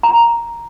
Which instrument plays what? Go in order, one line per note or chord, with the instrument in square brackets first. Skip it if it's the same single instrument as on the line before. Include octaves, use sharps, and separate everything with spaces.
[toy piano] A#5